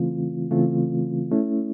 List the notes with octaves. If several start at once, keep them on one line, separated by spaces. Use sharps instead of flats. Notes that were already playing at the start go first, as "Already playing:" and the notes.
Already playing: C#3 E3 A3 C4 F4
C#3 E3 A3 C4 F4
A3 C#4 E4